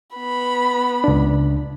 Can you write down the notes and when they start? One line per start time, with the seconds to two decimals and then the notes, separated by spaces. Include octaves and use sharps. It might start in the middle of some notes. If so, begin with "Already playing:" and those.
0.15 B3 B5
1.04 C#2 D4